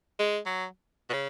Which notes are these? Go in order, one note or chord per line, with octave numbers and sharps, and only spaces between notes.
G#3
F#3
B2
C#3